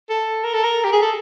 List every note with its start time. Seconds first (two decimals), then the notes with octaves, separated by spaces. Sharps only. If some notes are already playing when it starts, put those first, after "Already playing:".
0.10 A4
0.44 A#4
0.53 A4
0.64 A#4
0.84 G4
0.93 G#4
1.02 A4